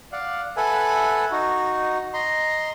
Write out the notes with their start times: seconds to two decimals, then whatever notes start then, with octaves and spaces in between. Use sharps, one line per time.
0.12 D5 F5 F#5
0.57 A4 B4 E5 F#5 G#5
1.31 D#4 F#4
2.13 D#5 A#5 C6